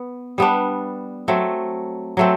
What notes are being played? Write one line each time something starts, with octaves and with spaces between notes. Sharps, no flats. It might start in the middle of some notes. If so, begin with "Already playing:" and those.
Already playing: B3
G3 B3 D4
F#3 A3 C4
F#3 A3 C4